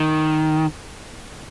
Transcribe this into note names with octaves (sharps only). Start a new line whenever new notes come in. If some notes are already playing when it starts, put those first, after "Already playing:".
Already playing: D#3